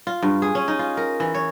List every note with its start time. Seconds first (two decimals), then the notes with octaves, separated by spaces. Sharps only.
0.07 F4
0.23 G2
0.42 G#4
0.55 C#4
0.68 D#4
0.79 F4
0.97 A#4
1.20 E3
1.34 C#5